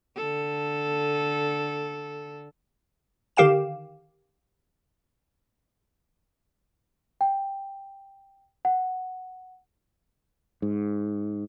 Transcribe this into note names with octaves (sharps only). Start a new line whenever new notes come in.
D3 A4
D3 D#3 G4 F5 G5 E7
G5
F#5
G#2